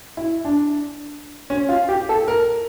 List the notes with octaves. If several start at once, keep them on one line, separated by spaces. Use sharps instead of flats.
E4
D4
C#4
F4
G4
A4
A#4